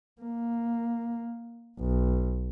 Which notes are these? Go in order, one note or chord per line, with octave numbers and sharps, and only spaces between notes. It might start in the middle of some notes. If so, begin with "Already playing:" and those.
A#3
B1